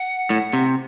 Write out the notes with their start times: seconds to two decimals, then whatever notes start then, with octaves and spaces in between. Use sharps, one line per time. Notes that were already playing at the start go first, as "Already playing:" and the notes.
Already playing: F#5
0.30 A2
0.53 C3